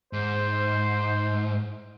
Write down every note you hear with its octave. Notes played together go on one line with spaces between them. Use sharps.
G#2 C5